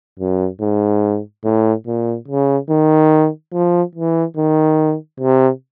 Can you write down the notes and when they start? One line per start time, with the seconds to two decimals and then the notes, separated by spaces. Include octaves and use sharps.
0.19 F#2
0.61 G#2
1.44 A2
1.87 A#2
2.28 C#3
2.70 D#3
3.53 F3
3.95 E3
4.37 D#3
5.20 C3